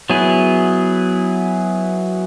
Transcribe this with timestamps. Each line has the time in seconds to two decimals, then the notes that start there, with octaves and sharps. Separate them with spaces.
0.10 F#3 B3 E4 G#4